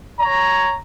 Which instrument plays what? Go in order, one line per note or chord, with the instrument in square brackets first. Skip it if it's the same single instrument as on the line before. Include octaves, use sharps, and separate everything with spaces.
[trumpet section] C#5 A#5